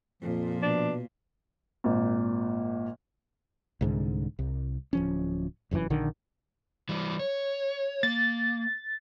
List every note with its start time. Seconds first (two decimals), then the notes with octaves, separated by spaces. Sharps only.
0.23 F2 A#2 F3
0.62 B2 D4
1.84 G#1 A#2
3.81 C2 G#2 D3
4.39 C2
4.93 D1 F3 C#4
5.71 F1 F#2 C#3 E3
5.90 A#1 D3 D#3
6.89 E3 G3
7.19 C#5
8.03 A#3 A6